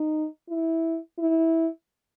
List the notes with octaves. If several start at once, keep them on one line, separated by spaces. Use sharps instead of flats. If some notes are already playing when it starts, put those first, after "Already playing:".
Already playing: D#4
E4
E4